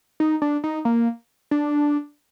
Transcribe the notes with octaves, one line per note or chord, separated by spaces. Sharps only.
D#4
D4
D#4
A#3
D4